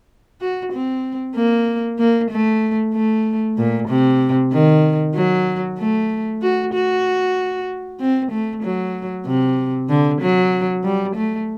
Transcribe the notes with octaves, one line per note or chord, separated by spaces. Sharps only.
F#4
C4
A#3
A#3
A3
A3
A#2
C3
D#3
F#3
A3
F#4
F#4
C4
A3
F#3
C3
D3
F#3
G3
A3